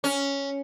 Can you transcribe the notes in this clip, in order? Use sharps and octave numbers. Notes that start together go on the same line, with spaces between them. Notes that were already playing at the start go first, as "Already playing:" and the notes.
C#4